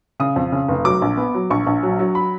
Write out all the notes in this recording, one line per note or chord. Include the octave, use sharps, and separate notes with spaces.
C#3 D#6
F2
C#3
F1
F#3 D6
A#1
B3
F#3
A#1 C#6
A#1
F#3
F#3
B5